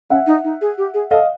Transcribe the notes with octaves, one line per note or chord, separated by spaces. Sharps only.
C#4 E5 F#5
D#4
D#4
G#4
G4
G#4
A4 D#5 F5